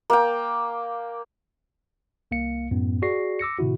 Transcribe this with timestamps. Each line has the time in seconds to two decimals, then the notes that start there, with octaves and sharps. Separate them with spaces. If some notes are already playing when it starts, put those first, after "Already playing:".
0.10 A#3 G5
2.31 C2 A#3 F5 C#7
2.71 F#2 A2 B3
3.02 F#4 G#4 D5 C#6 A#6 C7
3.39 D6 E6 A#6 C#7
3.58 A2 C3 D#3 E4 F#4